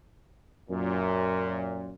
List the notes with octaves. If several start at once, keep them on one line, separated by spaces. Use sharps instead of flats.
F#2 A#2